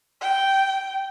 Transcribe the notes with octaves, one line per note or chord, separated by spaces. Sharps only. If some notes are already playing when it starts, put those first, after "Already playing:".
G5